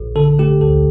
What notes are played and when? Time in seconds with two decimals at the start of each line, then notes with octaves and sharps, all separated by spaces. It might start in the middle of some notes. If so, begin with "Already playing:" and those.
Already playing: A#1
0.16 D3 A4
0.39 A3 G4
0.61 D2 A4